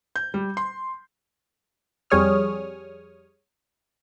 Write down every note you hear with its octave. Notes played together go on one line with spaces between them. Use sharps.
G6
G3
C6
F2 G3 G#4 C#5 D#6 F6